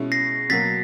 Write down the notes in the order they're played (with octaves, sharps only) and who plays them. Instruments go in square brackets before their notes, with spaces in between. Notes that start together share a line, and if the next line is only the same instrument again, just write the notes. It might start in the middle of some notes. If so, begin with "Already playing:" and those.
Already playing: [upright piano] B2 G#3 C#4 E4
[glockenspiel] A#6 C7
[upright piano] B2 F#3 A#3 [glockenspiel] A6 B6